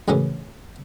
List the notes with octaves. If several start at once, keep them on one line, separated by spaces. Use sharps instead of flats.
F#2 A2 C#3 E3 C#4